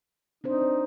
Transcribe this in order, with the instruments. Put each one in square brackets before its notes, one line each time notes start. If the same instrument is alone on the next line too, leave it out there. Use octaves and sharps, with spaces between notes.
[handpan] C4 D4 C5 [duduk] D#4